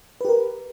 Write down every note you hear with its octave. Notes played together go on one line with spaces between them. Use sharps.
G4 A#4 B4